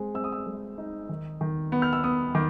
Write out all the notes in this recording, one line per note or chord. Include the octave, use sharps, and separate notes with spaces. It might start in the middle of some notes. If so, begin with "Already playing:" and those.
Already playing: G#3 C4
C4 E6
D#6
E6
G#3
D#4
D#3
D#3
B3
F6
E6
B3 D#6
D#3 D6